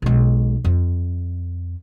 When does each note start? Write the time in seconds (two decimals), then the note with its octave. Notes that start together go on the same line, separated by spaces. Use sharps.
0.02 B1 G#3
0.65 F2